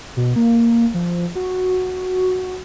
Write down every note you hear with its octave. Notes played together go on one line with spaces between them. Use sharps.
B2
A#3
F3
F#4